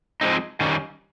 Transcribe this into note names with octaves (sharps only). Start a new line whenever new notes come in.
F3 G#3 C4 D#4
D#3 G3 C#4